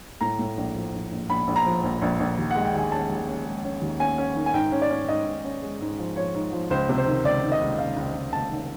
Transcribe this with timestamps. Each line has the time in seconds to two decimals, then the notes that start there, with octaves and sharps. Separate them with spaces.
0.21 A2 A#5
0.39 A2
0.57 A#1
0.75 F3
0.94 A#1
1.11 A#1
1.29 A#1 B5
1.47 A#1
1.56 A#5
1.65 F3
1.83 A#1
2.02 A#1
2.20 A#1
2.38 D#2
2.51 G#3 F#5
2.65 G5
2.74 D#2 G#5
2.92 C#4 A5
3.10 D#2
3.28 C#4
3.45 G#3
3.64 C#4
3.82 D#2
3.99 C#4 G#5
4.18 C#4
4.35 D#3
4.46 G#5
4.54 G#2 G5
4.72 C#4
4.82 D5
4.91 C#4
5.08 G#2 D#5
5.26 G#2
5.44 C#4
5.62 G#3
5.81 G#2
5.98 F3
6.16 F3 C#5
6.34 G#2
6.52 F3
6.70 C#2 C5
6.89 C3
6.98 C5
7.06 D#3
7.25 C#2 D5
7.43 D#3
7.52 D#5
7.61 C#2
7.78 C#2 F5
7.96 C#2
8.15 C#2
8.33 C#2 A5
8.51 D#3